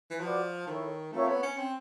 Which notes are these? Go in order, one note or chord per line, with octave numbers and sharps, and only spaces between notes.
E3
F3 F#4 B4 D5
D#3 E4 A4 C#5
A3 C4 F4 A#4 C#5 E5
B3
C#4
C4